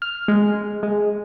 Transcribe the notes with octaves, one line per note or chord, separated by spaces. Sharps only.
F6
G#3
G#3